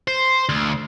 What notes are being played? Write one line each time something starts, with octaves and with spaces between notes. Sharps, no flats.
C5
D2